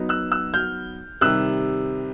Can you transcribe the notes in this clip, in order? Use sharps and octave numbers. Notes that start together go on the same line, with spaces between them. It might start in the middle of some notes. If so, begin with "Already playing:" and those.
Already playing: F#3 B3 D#4
E6 F#6
E6 F#6
F6 G6
C3 D#3 G3 E6 F#6